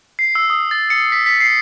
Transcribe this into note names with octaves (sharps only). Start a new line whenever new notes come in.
C7
E6
D#6
A6
C#7
B6
B6
C7